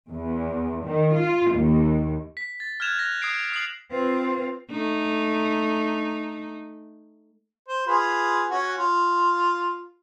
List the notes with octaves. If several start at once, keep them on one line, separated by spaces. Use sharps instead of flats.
E2
D#3
F4
D#2
B6
A6
F6 F#6 G#6 E7 F7
F#6 A#6 F7
D#6 G#6 C7 D7 F7
D#6 C7 F7 F#7
C4 F4 B4
A3 D#4
C5
F4 G#4 B4
C#4 F#4 F#5
F4